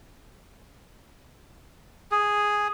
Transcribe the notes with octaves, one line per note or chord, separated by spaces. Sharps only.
G#4